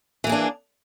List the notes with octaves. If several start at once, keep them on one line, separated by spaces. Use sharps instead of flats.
E3 A#3 D4 G#4